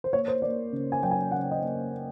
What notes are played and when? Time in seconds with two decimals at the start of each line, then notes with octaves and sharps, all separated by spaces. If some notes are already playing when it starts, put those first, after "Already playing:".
0.04 C5
0.13 A#3 C#5
0.28 C5
0.42 A#3 D5
0.72 C#3
0.92 G#5
1.03 F#3 G5
1.11 G#5
1.31 C#3 F#5
1.51 D#5
1.61 A#3